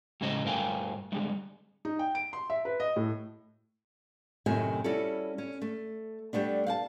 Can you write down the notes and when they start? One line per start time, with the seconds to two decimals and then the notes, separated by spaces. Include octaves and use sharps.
0.21 A2 C#3 G#3 C#4 C5 D#5
0.44 G2 A3 A#4 F5 G5 G#5
1.12 D3 G3 G#3
1.85 D#4
1.99 G5
2.15 D7
2.33 C6
2.50 E5
2.65 B4
2.80 D#5
2.96 A2
4.46 F#2 A2 C3 D#3 A3 G#5
4.84 G3 C#4 E4 F#4 A4
5.38 C#4
5.62 A3
6.33 G3 A3 B3 D4
6.67 F5 F#5 A5